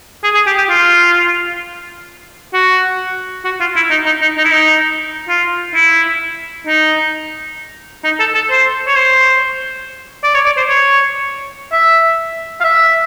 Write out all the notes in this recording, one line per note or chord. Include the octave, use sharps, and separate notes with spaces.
G#4
G#4
G4
G4
F4
F#4
F#4
F4
E4
D#4
D#4
D#4
D#4
E4
D#4
F4
E4
D#4
D#4
A4
A4
C5
C#5
C5
D5
C#5
D5
C5
C#5
E5
F5
E5